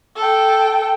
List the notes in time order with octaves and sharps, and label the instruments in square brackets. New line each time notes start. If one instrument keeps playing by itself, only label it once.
[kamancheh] A4 G5